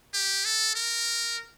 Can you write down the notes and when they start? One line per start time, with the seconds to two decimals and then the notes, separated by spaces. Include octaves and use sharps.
0.14 G4
0.45 A4
0.75 A#4